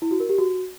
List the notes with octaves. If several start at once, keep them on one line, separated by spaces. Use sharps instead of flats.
E4
F#4
A#4
G4
F#4